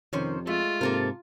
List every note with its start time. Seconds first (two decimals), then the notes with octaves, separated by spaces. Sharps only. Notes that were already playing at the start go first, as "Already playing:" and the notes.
0.13 F2 C3 D#3 C#4 C5
0.47 G#3 A3 F4
0.81 G#2 C3 A#3 A4 A#4